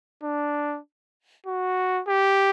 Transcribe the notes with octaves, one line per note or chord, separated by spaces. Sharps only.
D4
F#4
G4